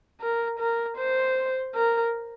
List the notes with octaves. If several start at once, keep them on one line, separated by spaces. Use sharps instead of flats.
A#4
A#4
C5
A#4